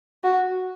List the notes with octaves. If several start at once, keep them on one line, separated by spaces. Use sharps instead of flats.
F#4